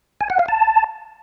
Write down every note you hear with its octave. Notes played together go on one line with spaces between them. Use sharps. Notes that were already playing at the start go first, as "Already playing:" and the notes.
G#5
F#5
F5
A5